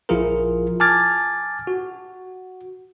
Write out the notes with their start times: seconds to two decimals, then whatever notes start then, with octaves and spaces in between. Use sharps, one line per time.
0.09 A#1 F3 E4 F4 G#4 A#4
0.80 G#5 A5 D6 F6 G#6 A6
1.67 F#4